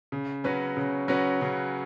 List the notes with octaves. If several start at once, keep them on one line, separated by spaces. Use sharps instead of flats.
C#3
F#3 C#4 F#4 B4
C#3
F#3 C#4 F#4 B4
C#3